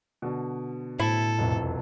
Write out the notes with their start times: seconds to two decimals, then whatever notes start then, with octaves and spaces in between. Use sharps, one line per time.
0.22 B2 D3
1.00 A2 E4 A4
1.39 E1 C2 F2